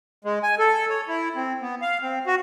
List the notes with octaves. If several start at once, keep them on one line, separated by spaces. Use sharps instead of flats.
G#3
G#5
A4
C#5
E4
C4
B3
F5
C4
F#4